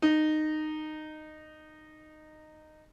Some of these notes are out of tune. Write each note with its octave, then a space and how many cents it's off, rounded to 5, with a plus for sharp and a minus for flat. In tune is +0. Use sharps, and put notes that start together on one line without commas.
D#4 -15